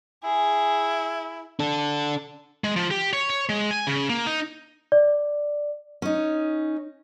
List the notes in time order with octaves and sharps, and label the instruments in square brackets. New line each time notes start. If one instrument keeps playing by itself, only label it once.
[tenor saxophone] E4 [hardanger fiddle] G#4
[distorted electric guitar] D4 A4
[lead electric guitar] G#3
F3
G4
C#5
C#5
G#3
G#5
C#3
A#3
D#4
[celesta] D5
[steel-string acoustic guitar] C#4 D#4